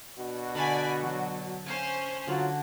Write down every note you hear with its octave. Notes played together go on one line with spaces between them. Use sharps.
B2 D4 F#4
D3 D5 F5 G#5 A5 B5
F#3
C#4 C5 F5 G#5
D3 F#3 C#4 F4 F#4